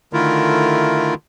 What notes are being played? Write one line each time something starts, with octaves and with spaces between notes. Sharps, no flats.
D3 D#3 A3 E4 F4 A#4